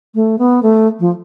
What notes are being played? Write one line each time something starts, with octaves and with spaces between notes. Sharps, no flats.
A3
B3
A3
F3